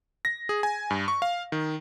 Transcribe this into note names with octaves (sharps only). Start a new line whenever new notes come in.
A#6
G#4
G#5
G2
C#6
F5
D#3